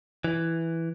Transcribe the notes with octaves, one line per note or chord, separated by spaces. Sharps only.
E3